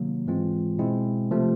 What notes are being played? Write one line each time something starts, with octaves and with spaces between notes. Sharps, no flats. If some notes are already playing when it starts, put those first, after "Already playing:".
Already playing: C3 D#3 F#3 A#3
G#2 E3 G#3 C4 F4
B2 G#3 C4 E4
C3 F3 A3